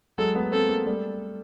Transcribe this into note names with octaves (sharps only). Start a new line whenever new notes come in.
F#3 G#3 A4
A3 B3
A#3 C4 A4
G#3 A#3
G3 A3